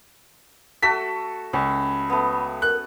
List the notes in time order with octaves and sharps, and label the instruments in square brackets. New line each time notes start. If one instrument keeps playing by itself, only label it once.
[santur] A3 F#4 A4 [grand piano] B6
[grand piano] C#2 [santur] C#4 [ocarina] B5
[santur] A3 B3
[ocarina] A#4 [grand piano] F#6